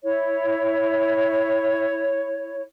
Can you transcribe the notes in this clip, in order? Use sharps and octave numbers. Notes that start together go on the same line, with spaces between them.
E4 C#5